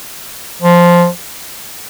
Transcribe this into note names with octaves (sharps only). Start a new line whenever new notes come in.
F3